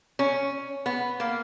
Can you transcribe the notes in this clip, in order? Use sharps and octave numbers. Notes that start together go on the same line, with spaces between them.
C#4
B3
A#3